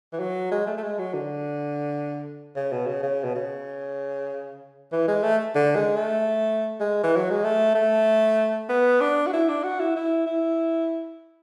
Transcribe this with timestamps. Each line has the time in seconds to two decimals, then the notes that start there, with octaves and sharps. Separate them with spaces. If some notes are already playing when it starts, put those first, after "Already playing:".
0.13 E3
0.19 F#3
0.51 G#3
0.67 A3
0.77 A3
0.82 G#3
0.98 F#3
1.14 D3
2.56 C#3
2.72 B2
2.87 C#3
3.03 C#3
3.24 B2
3.35 C#3
4.92 E3
5.08 G#3
5.23 A3
5.55 D3
5.75 G#3
5.96 A3
6.80 G#3
7.03 E3
7.16 F#3
7.30 G#3
7.44 A3
7.75 A3
8.69 B3
9.00 D4
9.26 F#4
9.33 E4
9.49 D4
9.63 F#4
9.79 E4
9.95 E4
10.26 E4